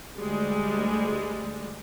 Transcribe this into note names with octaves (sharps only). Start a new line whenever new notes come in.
D2 G3 G#3